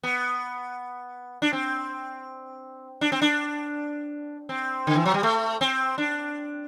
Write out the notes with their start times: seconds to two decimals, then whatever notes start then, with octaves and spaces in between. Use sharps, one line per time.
0.04 B3
1.42 D4
1.53 C4
3.01 D4
3.12 C4
3.22 D4
4.49 C4
4.87 D3
4.95 E3
5.06 F#3
5.14 G3
5.23 A3
5.61 C4
5.98 D4